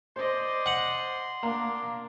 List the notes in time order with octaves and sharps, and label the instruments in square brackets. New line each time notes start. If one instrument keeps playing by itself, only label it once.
[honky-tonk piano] C5 [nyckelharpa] D5 D#5 [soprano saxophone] C6
[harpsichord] F#5
[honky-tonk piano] A#3 A#5 [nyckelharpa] D4